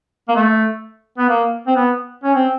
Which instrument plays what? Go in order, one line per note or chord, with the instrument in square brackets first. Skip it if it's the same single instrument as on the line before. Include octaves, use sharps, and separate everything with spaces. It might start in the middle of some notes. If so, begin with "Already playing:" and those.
[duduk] A#3
A3
B3
A#3
C4
B3
C#4
C4